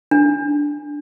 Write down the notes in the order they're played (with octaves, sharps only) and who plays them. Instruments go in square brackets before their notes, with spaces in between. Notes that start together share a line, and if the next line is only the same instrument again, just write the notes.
[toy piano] D4